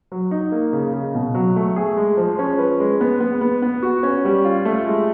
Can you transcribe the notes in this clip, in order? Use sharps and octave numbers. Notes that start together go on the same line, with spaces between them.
F#3
D#4
A#3
C#3
C#3
B2
F#3
A3
G#4
G#3
F3
C#4
B4
G#3
B3
B3
B3
B3
F#4
C#4
G3
F4
A3
G#3